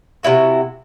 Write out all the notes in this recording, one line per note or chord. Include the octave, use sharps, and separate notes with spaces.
C3 E3 E4 F#4